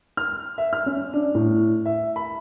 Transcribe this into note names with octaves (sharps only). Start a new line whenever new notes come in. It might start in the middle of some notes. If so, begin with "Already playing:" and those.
F6
E5
F6
C#4
D4
A2
E5
B5